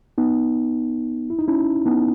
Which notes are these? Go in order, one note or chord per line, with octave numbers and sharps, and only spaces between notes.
B3 D#4
E4
D#4
C#4 E4
B3 D#4